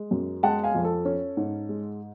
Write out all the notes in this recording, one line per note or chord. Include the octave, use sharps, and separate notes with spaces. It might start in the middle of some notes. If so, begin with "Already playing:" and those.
Already playing: G#3
F#2
G#3 F#5 A5
F5 G#5
F2
A4
C#4
G#2
G#3